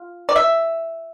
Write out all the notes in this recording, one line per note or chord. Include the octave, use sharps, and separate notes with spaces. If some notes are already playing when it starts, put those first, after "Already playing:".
Already playing: F4
D5
E5